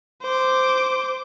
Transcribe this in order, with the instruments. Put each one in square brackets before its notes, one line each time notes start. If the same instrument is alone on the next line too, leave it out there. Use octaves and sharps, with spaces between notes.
[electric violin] C5 D6